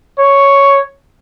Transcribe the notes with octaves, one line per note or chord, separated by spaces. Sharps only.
C#5